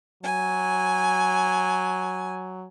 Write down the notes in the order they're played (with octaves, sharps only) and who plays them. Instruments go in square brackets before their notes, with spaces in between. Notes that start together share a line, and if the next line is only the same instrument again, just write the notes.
[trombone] F#3 [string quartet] G#5